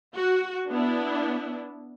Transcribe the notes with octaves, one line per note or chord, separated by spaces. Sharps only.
F#4
B3 D4 E4